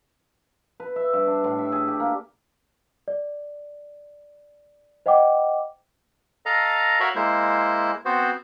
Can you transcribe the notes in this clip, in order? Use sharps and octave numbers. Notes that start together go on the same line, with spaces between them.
B4
E5
G2
D4
A2
E5
G#4
G4
A#3
D5
C5 D#5 F#5 G5 D6
A4 D#5 F5 A#5
F#4 A#4 C#5 E5 F5 B5
G#3 A#3 E4 C5
B3 C4 F#4 C5